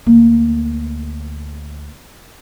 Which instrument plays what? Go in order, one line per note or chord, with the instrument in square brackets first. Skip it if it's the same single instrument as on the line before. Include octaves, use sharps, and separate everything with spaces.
[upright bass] D2 A#3